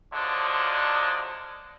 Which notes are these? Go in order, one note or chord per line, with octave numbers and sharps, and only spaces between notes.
D3 F3 F#3 G#3 D4